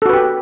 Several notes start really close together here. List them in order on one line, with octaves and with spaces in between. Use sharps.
A4 F#4 B4 G4